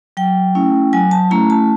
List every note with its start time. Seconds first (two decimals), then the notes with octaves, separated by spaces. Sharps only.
0.17 F#3 G5
0.55 A3 C#4 E4
0.93 F#3 G#5
1.11 A5
1.31 A3 C#4 E4 A#5
1.50 A5